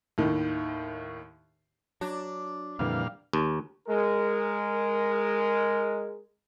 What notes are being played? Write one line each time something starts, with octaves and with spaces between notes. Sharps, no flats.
D#2 A2 D#3
F#3 D4
F2 A#2 D3 E3 G3 F5
D#2
G#3 A#4